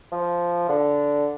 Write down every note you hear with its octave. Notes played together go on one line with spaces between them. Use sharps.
F3
D3